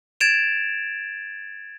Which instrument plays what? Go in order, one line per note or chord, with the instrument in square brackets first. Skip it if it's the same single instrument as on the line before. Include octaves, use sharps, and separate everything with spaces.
[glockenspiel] G#6 A6 D7 E7 F7